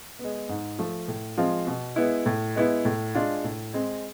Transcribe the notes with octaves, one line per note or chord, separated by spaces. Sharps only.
G#3 B3
G#2
F3 A3
A2
F3 G#3 C4 F4
B2
G#3 B3 E4
A2
G#3 B3 E4
A2
G#3 D4 F4
A2
G#3 C4